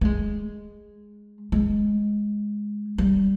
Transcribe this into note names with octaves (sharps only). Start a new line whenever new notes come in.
A3
G#3
G#3
G3